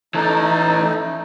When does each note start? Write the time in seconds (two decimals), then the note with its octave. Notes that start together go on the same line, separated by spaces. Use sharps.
0.14 E3 A3 D#4 A4